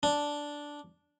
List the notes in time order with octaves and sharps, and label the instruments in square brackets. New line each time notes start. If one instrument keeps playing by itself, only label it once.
[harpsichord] D4